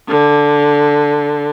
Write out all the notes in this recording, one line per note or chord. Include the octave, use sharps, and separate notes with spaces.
D3